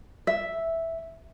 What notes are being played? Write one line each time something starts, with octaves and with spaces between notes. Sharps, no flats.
E5